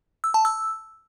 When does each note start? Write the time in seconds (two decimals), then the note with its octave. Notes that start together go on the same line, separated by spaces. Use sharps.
0.24 E6
0.34 A5
0.45 E6